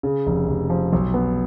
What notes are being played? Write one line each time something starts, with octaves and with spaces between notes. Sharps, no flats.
C#3
F1
F1
F3
B1
B3